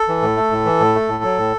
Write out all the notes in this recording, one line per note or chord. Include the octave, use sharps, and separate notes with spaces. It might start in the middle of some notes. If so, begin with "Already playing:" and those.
Already playing: A4
E3
A2
A3
A2
E3
A2
A3
A2
F#3
A2